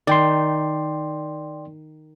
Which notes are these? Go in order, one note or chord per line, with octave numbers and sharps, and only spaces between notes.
D#3 D5 G5 C6